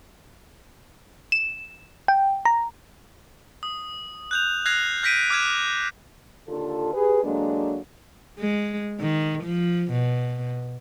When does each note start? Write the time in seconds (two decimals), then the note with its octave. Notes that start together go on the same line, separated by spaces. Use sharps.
1.32 E7
2.08 G5
2.45 A#5
3.63 D#6
4.31 F#6 G6 F7
4.65 F6 F#6 G#6 A#6 C7 F7
5.03 F6 G6 A#6 B6 D7 D#7
5.30 D6 F6 F#6 G#6 E7
6.48 D#2 D3 F4 A4
6.93 G4 G#4 B4
7.24 D3 F#3 G#3 A#3 D4
8.40 G#3
9.00 D#3
9.44 F3
9.91 B2